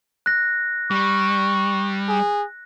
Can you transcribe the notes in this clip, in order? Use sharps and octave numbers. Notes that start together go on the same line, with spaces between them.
F#6 A#6
G3 C#6
G#4